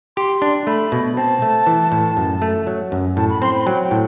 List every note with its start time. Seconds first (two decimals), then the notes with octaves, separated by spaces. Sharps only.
0.17 G4 C6
0.42 D4
0.67 A3 B5
0.92 B2
1.17 C4 A5
1.42 A3
1.67 E3
1.92 A2
2.17 F#2
2.42 A3
2.67 F#3
2.92 F#2
3.16 A2 A5
3.30 B5
3.42 C4 C6
3.55 B5
3.66 F#3 G5
3.84 G5
3.91 A2